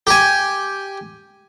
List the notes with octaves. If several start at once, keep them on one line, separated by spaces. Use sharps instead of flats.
G4 G#5